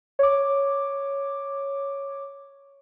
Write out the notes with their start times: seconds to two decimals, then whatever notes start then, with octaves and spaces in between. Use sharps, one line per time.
0.19 C#5 D6